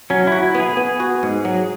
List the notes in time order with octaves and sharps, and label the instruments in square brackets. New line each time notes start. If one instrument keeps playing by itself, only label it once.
[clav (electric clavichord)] F#3 [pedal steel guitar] C#4
[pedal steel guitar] E4 [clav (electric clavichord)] F#4
[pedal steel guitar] E4
[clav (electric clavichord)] B3
[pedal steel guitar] G#4
[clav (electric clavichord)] B3
F#4
G#2
F#3